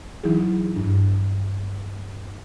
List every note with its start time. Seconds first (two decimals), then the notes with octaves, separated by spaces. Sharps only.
0.24 E3 F#3 D#4 E4 G#4
0.75 G2 D4